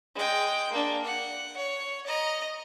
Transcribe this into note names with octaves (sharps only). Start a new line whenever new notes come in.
G#3 G5
A#3 D4
F#5
C#5
D#5 A#5